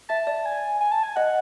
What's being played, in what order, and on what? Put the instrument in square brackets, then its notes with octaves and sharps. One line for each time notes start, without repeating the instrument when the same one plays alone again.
[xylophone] E5 [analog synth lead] A5
[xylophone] D5
[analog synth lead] G#5
G#5
A5
G#5
[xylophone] D#5 [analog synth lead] F#5